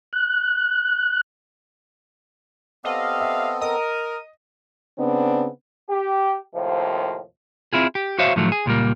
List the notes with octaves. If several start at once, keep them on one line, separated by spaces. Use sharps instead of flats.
F#6
B3 C4 G4 A4 D5 D#5 F5
E5
A#4 D#5 D#6
C#3 B3 C4 D4
G4
D#2 A2 C3 F3
C4 E4 F4 G#4
G4
F#4 C5 C#5 E5 F5
A2 D#3 F3 F#3 A3
G#4
C#2 A#2 G3 A#3